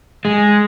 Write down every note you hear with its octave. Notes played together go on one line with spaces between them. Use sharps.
G#3